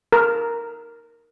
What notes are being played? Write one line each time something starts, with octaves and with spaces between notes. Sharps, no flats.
A#4